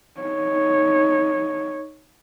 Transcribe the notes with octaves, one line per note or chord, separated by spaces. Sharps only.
D#4 C#5